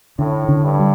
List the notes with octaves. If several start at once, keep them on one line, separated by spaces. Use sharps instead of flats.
A2 D3
D3
G2
G3